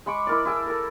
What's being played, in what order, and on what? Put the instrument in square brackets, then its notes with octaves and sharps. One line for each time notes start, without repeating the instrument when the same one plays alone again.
[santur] G#3 B5 C#6 D6
E4 A#4 D5
E4 G#4 A5 E6
A4 A#4